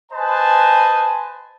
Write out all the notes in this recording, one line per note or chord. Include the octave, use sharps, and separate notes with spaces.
B4 C5 D#5 G#5 A5